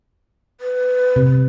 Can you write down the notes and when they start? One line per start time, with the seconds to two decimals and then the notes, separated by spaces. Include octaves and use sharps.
0.61 B4
1.16 C3